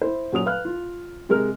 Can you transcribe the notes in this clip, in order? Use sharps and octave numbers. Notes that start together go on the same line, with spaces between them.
E4 C5
A#2 F#3 C#4 D#6 F7
B4 F5 F6 F#6
F4
C3 G#3 A#4 F6